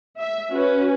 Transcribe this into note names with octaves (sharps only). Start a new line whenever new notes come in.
E5
C#4 F#4 B4